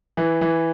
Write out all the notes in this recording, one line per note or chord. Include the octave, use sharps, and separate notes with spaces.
E3
E3